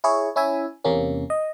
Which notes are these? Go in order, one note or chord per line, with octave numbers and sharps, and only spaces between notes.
E4 G#4 C#5
C#4 E4 E5 G#5
E2 C3 A#3 C#4
D#5